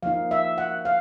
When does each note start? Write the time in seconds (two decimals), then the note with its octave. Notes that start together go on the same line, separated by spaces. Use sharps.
0.03 F3 A#3 D#4 F5
0.31 E5
0.58 F#5
0.85 F5